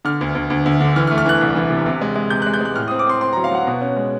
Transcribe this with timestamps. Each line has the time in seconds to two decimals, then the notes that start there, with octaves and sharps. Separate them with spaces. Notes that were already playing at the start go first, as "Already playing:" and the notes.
0.05 D3 F6
0.21 D2
0.35 D2
0.50 D2
0.66 D2
0.80 D3
0.96 E3 F6
1.07 F6
1.11 A3
1.18 F6
1.26 E3 F#6
1.41 C2
1.55 E3
1.70 C3
1.86 C3
2.01 G#3
2.15 G#3
2.30 C3 G6
2.42 F#6
2.46 G#3
2.54 G6
2.61 G#3 F#6
2.76 A2 F6
2.88 D#6
2.91 C4
2.99 D6
3.07 C4 C6
3.21 C4 C6
3.33 A#5
3.37 F#3
3.44 F5
3.51 F#3 F#5
3.67 B2
3.81 C#4
3.96 G#3